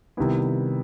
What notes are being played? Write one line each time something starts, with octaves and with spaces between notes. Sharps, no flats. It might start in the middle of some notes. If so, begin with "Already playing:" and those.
C3 D#3 G3 B3 E4